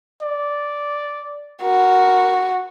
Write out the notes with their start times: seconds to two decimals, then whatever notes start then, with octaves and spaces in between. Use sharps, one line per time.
0.22 D5
1.63 F#4 A#4